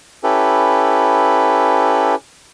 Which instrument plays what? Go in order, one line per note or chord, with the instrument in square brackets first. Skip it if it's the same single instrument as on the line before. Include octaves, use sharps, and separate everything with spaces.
[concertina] C#4 E4 G4 A4 B4